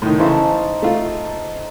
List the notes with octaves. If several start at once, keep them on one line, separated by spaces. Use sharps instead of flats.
A2 D#3
C#3 E3 D#4 A4 C5
A3 F4